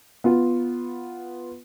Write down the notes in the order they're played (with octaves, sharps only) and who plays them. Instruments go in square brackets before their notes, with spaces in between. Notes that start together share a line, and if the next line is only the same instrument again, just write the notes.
[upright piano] B3 F4